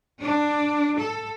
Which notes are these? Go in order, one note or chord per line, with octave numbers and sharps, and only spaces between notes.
D4
A4